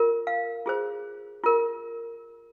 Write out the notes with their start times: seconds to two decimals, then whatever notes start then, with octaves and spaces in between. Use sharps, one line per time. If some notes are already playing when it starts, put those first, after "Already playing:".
Already playing: F4 A#4
0.27 F5
0.66 F4 G#4 C5
1.44 F4 A#4